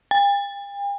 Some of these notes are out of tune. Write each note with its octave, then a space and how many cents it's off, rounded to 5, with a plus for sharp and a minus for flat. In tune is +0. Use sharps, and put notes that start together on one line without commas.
G5 +45